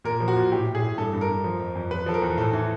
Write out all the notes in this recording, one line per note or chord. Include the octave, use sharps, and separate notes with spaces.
A#2 A#4
F3
F#4
A#2
A2 G4
A2
G#4
A2
G2 A4
G2
A#4
G2
F3
F2
F2
F3 B4
F3 A4
A#4
E2
A2 A4
E3